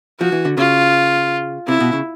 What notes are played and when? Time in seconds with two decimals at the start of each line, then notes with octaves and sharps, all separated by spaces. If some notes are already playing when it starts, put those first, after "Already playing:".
0.20 F3 F#4
0.32 E3
0.45 D3
0.57 C#3 F4
1.68 C3 E4
1.80 B2
1.93 C#3